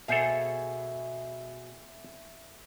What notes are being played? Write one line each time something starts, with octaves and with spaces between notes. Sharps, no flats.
B2 E4 G#4 A4 C5 E5 F5